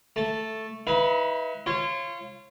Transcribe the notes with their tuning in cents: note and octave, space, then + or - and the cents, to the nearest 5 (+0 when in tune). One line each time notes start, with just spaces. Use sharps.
A3 +0 A5 +0
D#4 +45 B4 +0 E5 +45
F4 -30 C#5 -25